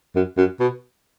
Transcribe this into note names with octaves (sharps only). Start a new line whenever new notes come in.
F#2
F#2
B2